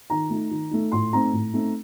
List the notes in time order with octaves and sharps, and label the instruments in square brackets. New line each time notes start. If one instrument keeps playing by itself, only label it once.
[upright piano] D#3 A#5
A3 D#4
D#3
A3 D#4
A2 C6
A3 C4 D#4 A#5
A2
A3 C4 D#4